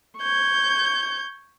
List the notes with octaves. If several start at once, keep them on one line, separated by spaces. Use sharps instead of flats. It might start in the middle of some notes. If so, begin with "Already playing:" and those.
C#6 G6 G#6